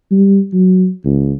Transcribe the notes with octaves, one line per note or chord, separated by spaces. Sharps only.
G3
F#3
C#2